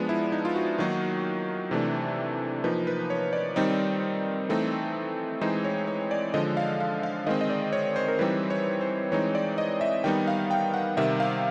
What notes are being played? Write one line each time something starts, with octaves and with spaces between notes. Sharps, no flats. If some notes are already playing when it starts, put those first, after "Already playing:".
Already playing: F3 G#3 B3 D4
E4
D#4
F4
F#4
D#3 F#3 A#3 D#4
C3 E3 A3 D4
F3 A#3 D#4 B4
B4
C#5
D5
D#3 G3 C4 D#4
E3 A3 C4 D#4
E3 G#3 C4 D#4 C5
C#5
C#5
D5
D3 F3 G#3 D#5
F5
F5
F5
D#3 G#3 C4 D#5
D#5
D5
C#5
C5
A#4
E3 G3 C4 D#4 B4
C#5
C5
E3 G#3 C4 D#4 C#5
D5
D#5
E5
D#3 G3 B3 D#4 G5
F5
G5
F#5
C3 D#3 G3 E5
F5